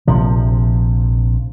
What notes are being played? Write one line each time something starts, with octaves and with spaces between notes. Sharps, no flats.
A#1 C3 F3